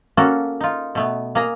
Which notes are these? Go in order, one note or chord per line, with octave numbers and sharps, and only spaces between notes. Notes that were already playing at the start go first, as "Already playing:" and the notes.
A#3 C#4 F#4 A4
D#4 F4
B2 A3 B3
A#3 G#4 A#5